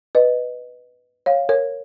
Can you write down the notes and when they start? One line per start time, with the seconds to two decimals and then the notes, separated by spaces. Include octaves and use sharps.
0.15 B4 D#5
1.26 C#5 F5
1.49 A#4 C#5